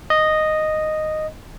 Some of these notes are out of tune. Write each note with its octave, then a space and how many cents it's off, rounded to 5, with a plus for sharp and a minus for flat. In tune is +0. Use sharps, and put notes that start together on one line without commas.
D#5 -5